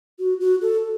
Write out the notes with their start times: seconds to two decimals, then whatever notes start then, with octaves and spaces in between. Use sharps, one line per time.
0.19 F#4
0.40 F#4
0.62 A4